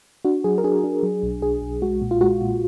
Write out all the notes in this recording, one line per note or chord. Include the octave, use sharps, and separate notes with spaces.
D4 F#4
F#3 G#4
A#4
D4 G#4
D4
F#3
B1
B1 G#4
B1
G#3 F#4
A#2
F4
G#3 F#4
A#2